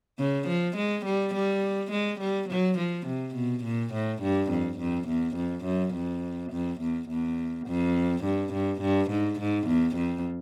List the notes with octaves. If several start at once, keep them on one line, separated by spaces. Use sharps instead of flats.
C#3
F3
G#3
G3
G3
G#3
G3
F#3
F3
C3
B2
A#2
A2
G2
F2
F2
E2
F2
F#2
F2
F2
E2
E2
F2
G2
G2
G2
G#2
G#2
E2
F2